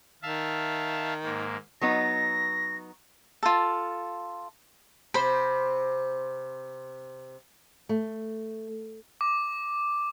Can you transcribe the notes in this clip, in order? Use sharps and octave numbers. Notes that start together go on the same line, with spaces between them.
D#3 E5 F5 A5
G#2 A#3
F#3 B3 D#4 A#6
F4 A4
C3 C5 B5
A3
D6